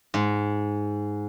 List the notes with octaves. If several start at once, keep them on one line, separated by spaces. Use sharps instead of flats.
G#2